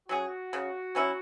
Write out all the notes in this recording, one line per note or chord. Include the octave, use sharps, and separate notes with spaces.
F#3 C#4 F#4 G#4
C#3
F#3 C#4 E4